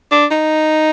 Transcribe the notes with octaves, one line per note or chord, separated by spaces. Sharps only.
D4
D#4